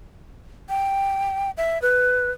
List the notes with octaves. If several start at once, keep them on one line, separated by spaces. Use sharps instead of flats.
G5
E5
B4